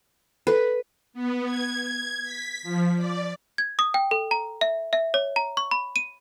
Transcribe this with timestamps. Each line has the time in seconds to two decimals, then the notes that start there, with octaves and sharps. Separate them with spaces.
0.47 A4 B4
1.13 B3
1.44 G#6
2.23 B6
2.63 F3
2.97 D5
3.58 G#6
3.79 D#6
3.94 G5
4.11 A4
4.31 A#5
4.61 E5
4.93 E5
5.14 C#5
5.36 A#5
5.57 C#6
5.71 B5
5.96 D#7